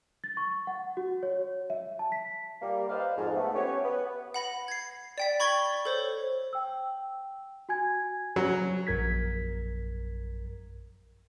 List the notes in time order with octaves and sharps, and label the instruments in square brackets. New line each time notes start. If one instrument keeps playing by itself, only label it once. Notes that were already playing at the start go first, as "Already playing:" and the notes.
[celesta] A6
C#6
F#5
F#4
C#5
E5
A5
B6
[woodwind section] G3 A#3
B4 C5 D5 D#5 F5
F2 G#2
A3 B3
B3 C#4 G4 C#5
B3
[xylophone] F#5 B5 A#6
G#6 C7
D5 G5 B6
B5 C#6 G#6 A6 G7
A4 C5 C#5
[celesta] G5 E6
F#4 G#5 G#6
[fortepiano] F#3
[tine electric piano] A#1 F#2 A#4 G#6 B6